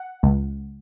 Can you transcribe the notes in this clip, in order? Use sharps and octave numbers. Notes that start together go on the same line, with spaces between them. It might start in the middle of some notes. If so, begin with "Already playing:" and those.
Already playing: F#5
C#2